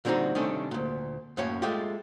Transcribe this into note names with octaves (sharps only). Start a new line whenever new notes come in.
A#2 D3 G3 C4 D#4 F#4
C3 D#3 G3 A3 C#4 D4
D2 A#2
F#2 A2 A#3 C#4 C#5
G#3 A3 F4 G4